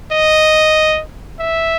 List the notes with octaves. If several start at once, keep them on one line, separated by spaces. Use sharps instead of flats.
D#5
E5